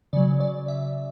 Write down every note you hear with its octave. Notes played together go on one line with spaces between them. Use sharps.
C#3 F#3 D5
D5
E5